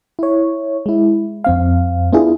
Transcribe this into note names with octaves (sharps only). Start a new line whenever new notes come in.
E4 C#5
G#3 E4
F2 C4 F5
B3 D4 E4 F4 G#4